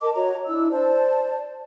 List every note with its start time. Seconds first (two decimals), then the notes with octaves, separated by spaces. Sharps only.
0.01 A#4 D#5 A5 D6
0.15 F#4 C#5 D#5 A#5
0.47 D4 E4 E6
0.71 C5 D5 A5